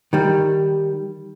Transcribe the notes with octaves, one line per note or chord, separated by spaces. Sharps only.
D#3 G3